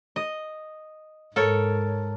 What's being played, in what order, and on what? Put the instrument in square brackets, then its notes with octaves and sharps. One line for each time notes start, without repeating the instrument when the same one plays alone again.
[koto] D#5
[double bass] G#2 [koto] A4 A#4 C#5